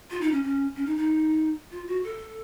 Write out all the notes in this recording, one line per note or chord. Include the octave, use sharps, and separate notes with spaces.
F4
D#4
C#4
C#4
C#4
D#4
D#4
F4
F#4
A4